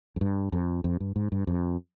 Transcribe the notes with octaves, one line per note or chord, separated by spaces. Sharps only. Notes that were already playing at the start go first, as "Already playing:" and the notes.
F2
G2
F2
F2
G2
G#2
G2
F2